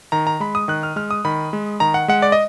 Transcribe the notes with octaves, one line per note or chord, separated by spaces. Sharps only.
D#3 A#5
A#5
G#3 B5
D#6
D#3 F#6
F6
G#3 F6
D#6
D#3 B5
G#3
D#3 A#5
F#5
G#3 F#5
D5
D#5